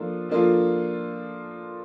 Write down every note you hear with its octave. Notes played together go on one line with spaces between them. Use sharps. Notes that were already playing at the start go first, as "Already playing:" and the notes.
Already playing: F3 A#3 D4 F4 A4
F3 A#3 D4 F4 A4